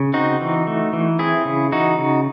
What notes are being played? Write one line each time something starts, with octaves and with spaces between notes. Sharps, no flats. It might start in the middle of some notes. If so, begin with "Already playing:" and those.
Already playing: C#3
C4 D#4 F#4
E3
A3
E3
C4 E4 G#4
C#3
E3 D#4 F#4
C#3